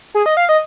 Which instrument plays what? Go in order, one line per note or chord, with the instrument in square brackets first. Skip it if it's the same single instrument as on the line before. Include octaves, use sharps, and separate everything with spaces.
[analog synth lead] G#4
D#5
F5
D#5